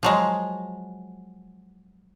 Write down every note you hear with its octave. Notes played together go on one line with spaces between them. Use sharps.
F3 F#3 G#3